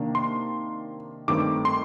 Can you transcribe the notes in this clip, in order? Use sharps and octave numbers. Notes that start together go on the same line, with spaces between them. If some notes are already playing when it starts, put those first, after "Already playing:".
Already playing: C3 D#3 A#3 D4
C6
G2 D#3 A3 C4 D6
C6